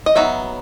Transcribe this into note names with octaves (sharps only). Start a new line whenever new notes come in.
D#5
F#3 B3 D#4 E5